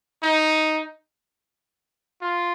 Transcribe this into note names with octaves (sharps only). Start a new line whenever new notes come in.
D#4
F4